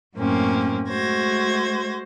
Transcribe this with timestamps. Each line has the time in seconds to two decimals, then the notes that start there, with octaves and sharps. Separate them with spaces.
0.15 F#2 A2 A#3 C4 C#4
0.88 G#3 A3 F#4 C5 G#6 A#6